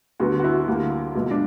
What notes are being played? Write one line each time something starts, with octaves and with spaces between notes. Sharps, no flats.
D2 D3 G3 B3 F#4
F#4
E4
D2 D3 G3 A#3
C#2 B2 F#3 A#3
D4